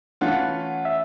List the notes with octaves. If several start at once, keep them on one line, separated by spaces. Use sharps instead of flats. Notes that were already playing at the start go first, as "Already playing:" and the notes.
E3 A3 C#4 F4 F#5
E5